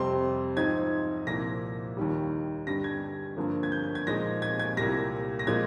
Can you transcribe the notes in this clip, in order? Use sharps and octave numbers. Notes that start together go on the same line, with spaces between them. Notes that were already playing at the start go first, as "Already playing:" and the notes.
Already playing: F2 C3 G3 C4 C6
G#2 F3 C4 D#4 G#6
C2 A#2 F3 A#6
D#2 D#3 G3
G2 D3 G3 A#6
G#6
G2 D3 F3 A#3
G#6
G6
G6
G#6
A#2 F3 G#3 D#4 A#6
G#6
G#6
C2 A#2 G3 A#6
A#6
A#2 F3 G#3 G#6